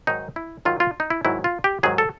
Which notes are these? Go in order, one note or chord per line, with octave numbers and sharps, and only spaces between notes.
G#2 D#3 F#3 D#4
E4
G#2 D#3 F#3 F4
F4
D#4
E4
G#2 D#3 F#3 E4
F4
G4
G#2 D#3 F#3 G#4
A4